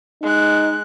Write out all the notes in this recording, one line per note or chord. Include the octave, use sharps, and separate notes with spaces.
G#3 D#4 F#6